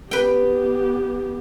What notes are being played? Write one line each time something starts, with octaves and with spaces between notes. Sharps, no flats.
B3 G4 B4 G5